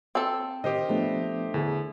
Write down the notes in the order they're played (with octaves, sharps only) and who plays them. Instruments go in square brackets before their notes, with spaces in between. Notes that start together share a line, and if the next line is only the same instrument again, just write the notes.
[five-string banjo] C4 A4
[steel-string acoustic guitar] D#3 [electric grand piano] G4 C5 D#5
[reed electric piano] F3 B3 D4 [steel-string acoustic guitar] A3
[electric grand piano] E2 [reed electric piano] D3 E4 G#4